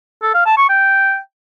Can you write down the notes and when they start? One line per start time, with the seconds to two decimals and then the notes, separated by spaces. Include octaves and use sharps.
0.22 A4
0.34 F5
0.46 A5
0.57 C#6
0.69 G5